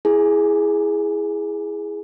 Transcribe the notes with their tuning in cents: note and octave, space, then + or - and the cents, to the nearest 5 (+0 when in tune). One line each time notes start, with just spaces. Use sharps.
E4 +0 G#4 +0 G#5 +35